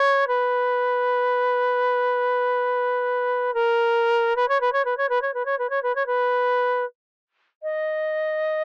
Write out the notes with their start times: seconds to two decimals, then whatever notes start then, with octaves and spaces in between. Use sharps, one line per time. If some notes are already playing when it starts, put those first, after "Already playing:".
Already playing: C#5
0.27 B4
3.54 A#4
4.36 B4
4.48 C#5
4.60 B4
4.72 C#5
4.84 B4
4.97 C#5
5.09 B4
5.21 C#5
5.33 B4
5.45 C#5
5.58 B4
5.69 C#5
5.82 B4
5.95 C#5
6.06 B4
7.62 D#5